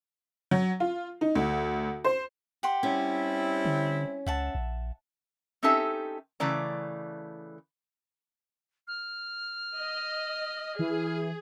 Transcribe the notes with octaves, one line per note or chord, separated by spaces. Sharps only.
F#3
F4
D#4
D2
C5
G4 F#5 C6
G3 C4 C#4 E4
D3
C#2 E5 F#5 A5
A#1
C4 C#4 D#4 G4 A4 E5
C#3 E3 A3 D5 A#5
F6
D#5
E3 G#4